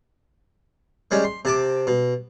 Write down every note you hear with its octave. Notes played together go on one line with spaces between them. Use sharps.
G3 G#3 C#4
C6
C3 A5 D6
B2